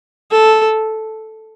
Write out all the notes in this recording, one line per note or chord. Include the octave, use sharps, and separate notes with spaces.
A4